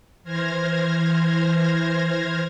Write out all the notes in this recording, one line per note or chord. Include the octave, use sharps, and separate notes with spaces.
E3 C5 F6 G#6 A#6